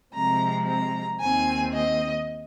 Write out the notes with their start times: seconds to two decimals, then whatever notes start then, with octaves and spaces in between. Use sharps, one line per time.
0.13 C3 F3 G#3 C4 A#5
0.67 A#5
1.19 D#2 D#3 C4 G#5
1.73 D#5